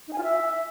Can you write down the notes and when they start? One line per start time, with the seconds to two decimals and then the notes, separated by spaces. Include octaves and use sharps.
0.08 D#4
0.13 G#5
0.18 F4
0.23 E5